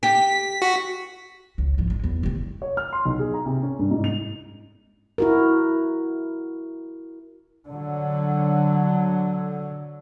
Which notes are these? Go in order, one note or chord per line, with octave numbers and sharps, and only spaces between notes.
G4 B6
F#4
C#2
G#1 F3
G#3
E2
D2 C3
C#5
F6
C6
B1
G#4
A#5
C3
C#4
G2
G#2
F7
E4 F#4 A#4
D3 F#3